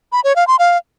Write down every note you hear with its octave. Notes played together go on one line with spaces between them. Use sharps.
B5
C#5
F5
C6
F5